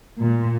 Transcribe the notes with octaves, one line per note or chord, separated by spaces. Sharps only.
A#2